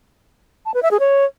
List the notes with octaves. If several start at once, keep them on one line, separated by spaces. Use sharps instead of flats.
A5
B4
E5
G#4
C#5